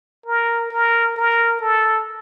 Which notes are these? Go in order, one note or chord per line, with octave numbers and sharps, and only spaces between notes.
A#4
A#4
A#4
A4